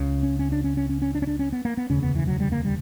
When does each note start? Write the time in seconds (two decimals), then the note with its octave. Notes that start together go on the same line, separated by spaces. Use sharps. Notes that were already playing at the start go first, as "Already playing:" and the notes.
Already playing: C#2 C#3
0.23 C#4
0.39 C#4
0.52 D4
0.64 C#4
0.77 C#4
0.89 C#4
1.02 C#4
1.15 D4
1.22 C#4
1.27 D4
1.39 C#4
1.52 B3
1.65 A#3
1.77 B3
1.90 E1 D2 C#3 C#4
2.02 B3
2.15 E3
2.27 F#3
2.40 G3
2.52 A#3
2.65 G3